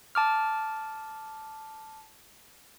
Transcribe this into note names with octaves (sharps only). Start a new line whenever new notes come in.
A5 D6 F6